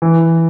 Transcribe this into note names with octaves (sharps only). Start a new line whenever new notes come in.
E3